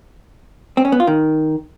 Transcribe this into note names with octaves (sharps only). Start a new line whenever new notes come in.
C4
C#4
B3
F4
D#3